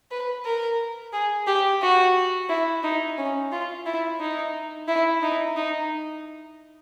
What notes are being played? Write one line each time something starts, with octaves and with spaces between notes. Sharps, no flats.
B4
A#4
G#4
G4
F#4
E4
D#4
C#4
F4
E4
D#4
E4
D#4
D#4